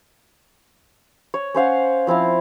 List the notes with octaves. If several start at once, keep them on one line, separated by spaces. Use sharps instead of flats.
C#5
C#4 C5 F5 F#5
F3 C4 E4 F5